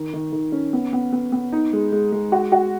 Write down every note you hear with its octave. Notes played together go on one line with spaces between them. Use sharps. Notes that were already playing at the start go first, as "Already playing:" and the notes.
Already playing: D#3
D#3
D#3
C#4
B3
B3
B3
B3
D#4
G#3
G#3
G#3
F#4
F#4